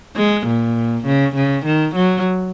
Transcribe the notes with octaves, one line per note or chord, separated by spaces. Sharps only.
G#3
A#2
C#3
C#3
D#3
F#3